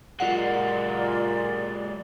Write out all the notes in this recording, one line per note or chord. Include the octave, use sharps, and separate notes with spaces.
A#2 F#3 G#3 F4 D5 F#5